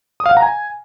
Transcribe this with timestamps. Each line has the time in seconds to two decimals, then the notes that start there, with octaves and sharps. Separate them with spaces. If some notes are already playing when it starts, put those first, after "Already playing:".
0.20 D#6
0.26 F5
0.31 F#5
0.37 A#5
0.42 G#5